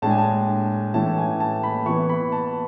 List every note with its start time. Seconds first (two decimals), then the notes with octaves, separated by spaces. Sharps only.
0.02 A2 G#3 D4 A5
0.10 G#5
0.18 A5
0.94 A2 E3 A3 C#4 E4 A5
1.18 G#5
1.40 A5
1.63 B5
1.86 E3 B3 E4 C#6
2.09 B5
2.32 A5